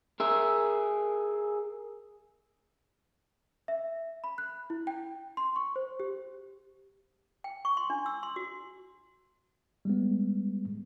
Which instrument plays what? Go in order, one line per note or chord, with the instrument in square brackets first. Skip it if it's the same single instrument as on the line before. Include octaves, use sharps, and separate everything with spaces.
[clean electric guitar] G#4 A#4 E5
[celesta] E5
B5
F#6
E4
G5
C6
C#6
C5
G4
[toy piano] G5
C#6
C6
D4
E6
C6
F#4
[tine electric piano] G3 G#3 B3